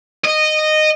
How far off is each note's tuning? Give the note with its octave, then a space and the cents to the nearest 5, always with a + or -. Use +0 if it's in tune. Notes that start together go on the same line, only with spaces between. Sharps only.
D#5 -15